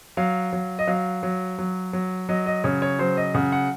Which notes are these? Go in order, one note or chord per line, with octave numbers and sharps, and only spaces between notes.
F#3 F5
F#3
D#5
F#3 F5
F#3
F#3
F#3
F#3 D#5
D#5
C#3 C#5
C#5
F#3 C5
D#5
C#3 F#5
F#5